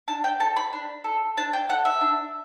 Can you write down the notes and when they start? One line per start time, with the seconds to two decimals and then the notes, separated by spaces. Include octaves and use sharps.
0.08 D4 A5
0.24 G5
0.40 A4 A5
0.56 B5
0.73 D4
1.04 A4
1.37 D4 A5
1.53 G5
1.69 A4 F#5
1.85 E5
2.01 D4